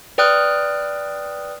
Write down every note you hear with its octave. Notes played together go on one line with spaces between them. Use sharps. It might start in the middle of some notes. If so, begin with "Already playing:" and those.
B4 D5 G5 D#6 F6 F#6